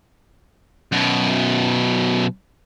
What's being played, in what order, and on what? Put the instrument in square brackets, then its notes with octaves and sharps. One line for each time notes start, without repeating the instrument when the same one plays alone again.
[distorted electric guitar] F#2 B2